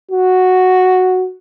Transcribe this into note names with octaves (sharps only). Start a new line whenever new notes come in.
F#4